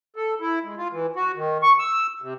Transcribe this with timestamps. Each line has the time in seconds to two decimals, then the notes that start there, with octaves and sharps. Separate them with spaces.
0.16 A4
0.40 E4
0.64 G#3
0.77 F4
0.92 E3
1.16 F#4
1.35 D#3
1.62 C#6
1.79 E6
2.22 C3